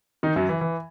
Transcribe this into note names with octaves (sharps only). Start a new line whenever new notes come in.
D#3 D#4
F#2 F#3
E3
E3